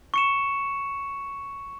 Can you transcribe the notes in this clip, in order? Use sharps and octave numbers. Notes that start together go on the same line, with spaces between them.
C#6 C#7 E7